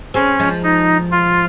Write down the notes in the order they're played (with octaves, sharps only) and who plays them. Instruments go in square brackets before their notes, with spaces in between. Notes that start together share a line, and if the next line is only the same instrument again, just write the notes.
[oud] G#3 C4 [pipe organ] C#4
[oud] F3 G#3
[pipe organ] D#4
F4